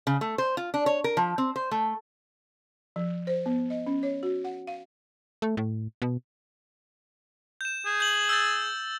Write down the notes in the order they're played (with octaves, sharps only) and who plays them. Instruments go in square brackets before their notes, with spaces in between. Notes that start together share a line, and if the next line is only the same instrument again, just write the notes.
[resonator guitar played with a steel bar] C#3
A3
C5
F4
D4
C#5
A#4
F3
C4
C5
A3
[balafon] F3
C5
B3
D#5
C#4
C#5
F#4
F#5
F5
[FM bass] A3
A2
B2
[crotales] G6 E7
[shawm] G#4
[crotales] G6 F#7
E6 G6 A6